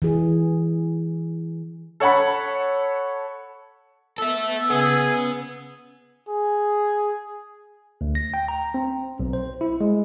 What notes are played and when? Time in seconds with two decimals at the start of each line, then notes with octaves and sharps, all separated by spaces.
0.02 E3 G#4
2.00 A4 C#5 F#5 A5 B5
4.18 B3 A4 E5 E6
4.70 C#3 B3 G#4
6.28 G#4
8.01 D2
8.15 A#6
8.34 G5
8.48 A#5
8.74 C4
9.20 B1
9.33 C5
9.61 E4
9.81 G#3